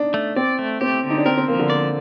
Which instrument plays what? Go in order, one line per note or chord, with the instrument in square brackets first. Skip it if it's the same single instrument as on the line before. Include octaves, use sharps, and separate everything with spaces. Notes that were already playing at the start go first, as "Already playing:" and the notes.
Already playing: [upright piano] D4 D#4
[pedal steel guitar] A3
[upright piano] C4 [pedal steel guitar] D5
[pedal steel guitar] A3
[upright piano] C4 [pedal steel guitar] G4
[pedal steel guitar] D3
[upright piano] D#4
D4
[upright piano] C4 [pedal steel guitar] A#4
[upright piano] C4
[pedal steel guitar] F3 [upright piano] A#3
[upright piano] D3
[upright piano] A#3 [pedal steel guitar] D5